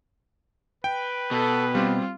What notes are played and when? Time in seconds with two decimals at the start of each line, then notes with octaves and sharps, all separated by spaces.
0.84 B4 G5
1.31 B2 A4
1.75 G3 C4 F4 G4